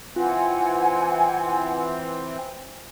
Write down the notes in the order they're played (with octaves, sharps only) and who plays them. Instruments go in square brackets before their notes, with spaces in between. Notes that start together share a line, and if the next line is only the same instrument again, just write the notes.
[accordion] E3 C4 [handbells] F4 [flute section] F#5 G#5